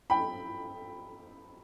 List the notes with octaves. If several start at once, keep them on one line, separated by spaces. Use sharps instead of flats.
G5 B5